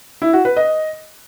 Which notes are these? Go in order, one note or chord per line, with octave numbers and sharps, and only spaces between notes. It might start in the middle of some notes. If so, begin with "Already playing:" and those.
E4
F#4
B4
D#5